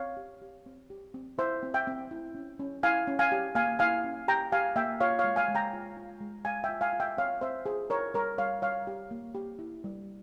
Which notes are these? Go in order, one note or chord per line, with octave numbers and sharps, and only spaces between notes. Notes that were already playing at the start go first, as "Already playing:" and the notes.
Already playing: C4 C#5 F5
G4
G4
C4
G4
C4
E4 C5 E5
C4
E5 G5
C4
E4
C#4
C#4
E4 F5 G#5
C#4
F5 G#5
G4
A#3 F5 G#5
E4 F5 G#5
C#4
G4 G5 A#5
G4 F5 G#5
A#3 E5 G5
F4 C#5 F5
C#5 F5
G#3
F5 G#5
G#3
G5 A#5
F4
F4
G#3
G#3 F5 G#5
E5 G5
F4
F5 G#5
F4
E5 G5
C4 C#5 F5
C4 C5 E5
F4 G#4 C5
E4 A#4 C#5
G3 A#4 C#5
G3 C#5 F5
G3 C#5 F5
G4
A#3
G4
E4
G3